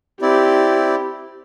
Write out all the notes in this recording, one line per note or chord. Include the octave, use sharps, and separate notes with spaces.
C4 E4 G4 D5